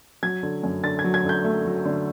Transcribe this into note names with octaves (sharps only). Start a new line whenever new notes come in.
F#3 G#6
D3
F#2
D3 A6
G#6
F#3
G#6
D3 G6
A3
F#3
D3